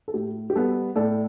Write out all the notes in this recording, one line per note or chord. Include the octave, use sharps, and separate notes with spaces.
A4
A2 G4
G4
G3 B3 A4
A2 A4 D5